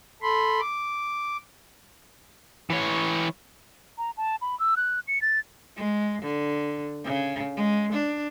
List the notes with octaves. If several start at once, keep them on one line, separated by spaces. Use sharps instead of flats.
A4 B5 C6
D6
E3 C#5
A#5
A5
B5
E6
F#6
C#7
A6
G#3
D3
C#3
G#3
D4